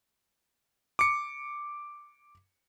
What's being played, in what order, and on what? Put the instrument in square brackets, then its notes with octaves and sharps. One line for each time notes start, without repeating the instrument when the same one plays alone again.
[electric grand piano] D6 C#7